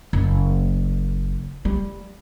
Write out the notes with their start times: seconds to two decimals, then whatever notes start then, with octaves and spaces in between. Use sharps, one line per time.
0.13 F#1
1.65 G3